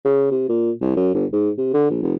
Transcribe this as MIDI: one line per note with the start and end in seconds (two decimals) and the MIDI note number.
0.05 0.28 49
0.31 0.45 48
0.49 0.71 46
0.81 0.94 36
0.96 1.12 42
1.14 1.26 31
1.33 1.50 44
1.58 1.71 48
1.74 1.90 50
1.90 1.99 34
2.02 2.14 29